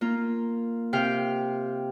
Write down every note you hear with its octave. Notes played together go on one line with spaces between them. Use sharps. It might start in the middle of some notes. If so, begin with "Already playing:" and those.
A#3 F4
C3 F5 G5